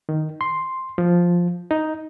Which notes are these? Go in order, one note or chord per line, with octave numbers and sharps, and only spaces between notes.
D#3
C6
F3
D#4